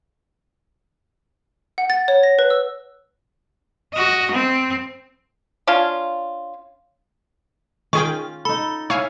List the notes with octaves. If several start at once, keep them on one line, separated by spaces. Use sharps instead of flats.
F#5
A6
C#5
A#6
B4
E6
F#4 D#5
C4
C#4 D4 F4
D#3 C#4 F4 G#4 G5 C#6
D#4 A4 B5
E4 C#5 F5 G#5